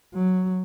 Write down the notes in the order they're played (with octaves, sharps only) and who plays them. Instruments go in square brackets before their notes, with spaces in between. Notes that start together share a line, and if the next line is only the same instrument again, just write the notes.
[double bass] F#3